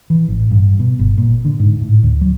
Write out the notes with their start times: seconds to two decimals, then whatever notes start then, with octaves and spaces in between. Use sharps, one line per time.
0.10 E3
0.28 A1
0.51 G2
0.79 B2
0.99 G1
1.18 A#2
1.45 D3
1.59 G#2
1.81 A2
2.03 D2
2.21 F#3